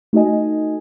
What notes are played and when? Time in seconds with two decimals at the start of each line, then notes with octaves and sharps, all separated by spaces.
0.13 A3 D#4 F#4 A4 D#5 G#5